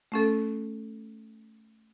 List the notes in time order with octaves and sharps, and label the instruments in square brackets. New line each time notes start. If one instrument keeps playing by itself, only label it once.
[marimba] A3 C#4 A4